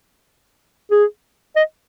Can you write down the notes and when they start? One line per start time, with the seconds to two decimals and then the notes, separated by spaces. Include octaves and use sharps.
0.91 G#4
1.56 D#5